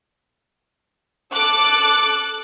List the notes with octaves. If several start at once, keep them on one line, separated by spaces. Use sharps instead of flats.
A4 D6 F#6